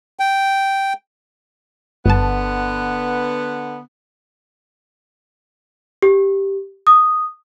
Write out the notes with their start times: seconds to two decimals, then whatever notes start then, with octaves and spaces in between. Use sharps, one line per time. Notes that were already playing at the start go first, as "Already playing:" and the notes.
0.20 G5
2.06 G1 D3 B3 A5
6.02 G4
6.87 D#6